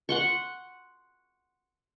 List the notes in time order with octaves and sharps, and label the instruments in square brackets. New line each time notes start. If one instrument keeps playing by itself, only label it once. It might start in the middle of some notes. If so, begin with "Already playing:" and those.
[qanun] F#5 C6 C#6